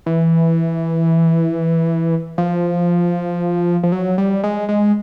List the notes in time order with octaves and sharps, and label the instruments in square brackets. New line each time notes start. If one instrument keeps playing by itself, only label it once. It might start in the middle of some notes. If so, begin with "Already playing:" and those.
[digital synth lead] E3
F3
F3
F#3
G3
G#3
G#3